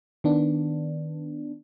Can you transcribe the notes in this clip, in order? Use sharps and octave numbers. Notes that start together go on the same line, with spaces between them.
D#3 B3 D4